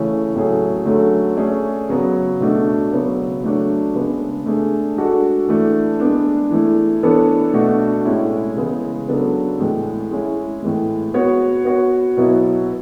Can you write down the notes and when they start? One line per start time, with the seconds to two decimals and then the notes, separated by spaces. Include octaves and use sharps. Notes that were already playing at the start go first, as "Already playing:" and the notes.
Already playing: C#3 E3 A3 C#4
0.35 A2 F#3 A3 C#4 G#4
0.85 D3 F#3 A3 C#4
1.37 A3 C#4 G#4 D5
1.89 C#3 F#3 B3
2.40 B2 A3 D4 F#4
2.92 C#3 F#3 B3
3.43 F#3 A3 D4 F#4 C#5
3.94 C#3 G#3 B3 D4
4.46 A3 D4 G#4
4.97 G#3 D4 F#4 A4 D5
5.48 E3 A3 D4
6.00 G#3 B3 D4
6.51 E3 A3 E4
7.03 E3 B3 D4 A4 C#5
7.54 B2 A3 D4 F#4
8.05 A2 G#3 C#4 E4
8.56 C#3 E3 G#3 B3
9.09 C#3 F#3 B3 D4 A4
9.59 A2 E3 G#3
10.11 G#3 C#4 E4
10.63 A2 E3 G#3
11.14 B3 F#4 C#5
11.65 B3 F#4 C#5
12.17 B2 F#3 B3 E4